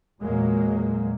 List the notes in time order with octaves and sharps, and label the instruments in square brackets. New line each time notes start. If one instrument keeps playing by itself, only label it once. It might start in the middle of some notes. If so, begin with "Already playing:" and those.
[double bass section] E2 A#2 F#3 G#3 A#3